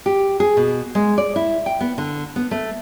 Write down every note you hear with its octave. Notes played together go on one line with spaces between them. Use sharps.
G4
G#4
B2
G#3
D5
E4
G5
B3
D3
B3
A3